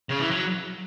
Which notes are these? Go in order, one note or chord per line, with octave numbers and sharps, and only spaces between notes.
C#3
E3
F#3